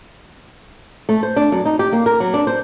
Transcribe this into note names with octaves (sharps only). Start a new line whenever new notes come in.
A3
C5
D4
F#2
D#4
G4
A#3
A#4
F#3
D4
C5